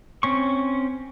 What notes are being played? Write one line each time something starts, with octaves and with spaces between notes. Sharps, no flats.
C4 C#4 C#6